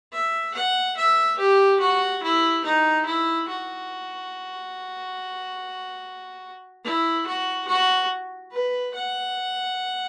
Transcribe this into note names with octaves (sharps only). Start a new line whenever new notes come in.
E5
F#5
E5
G4
F#4
E4
D#4
E4
F#4
E4
F#4
F#4
B4
F#5